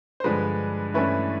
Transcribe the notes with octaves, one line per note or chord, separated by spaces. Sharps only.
C5
G2 D3 F3 G#3 B4
G2 E3 A3 C#4 E4 B4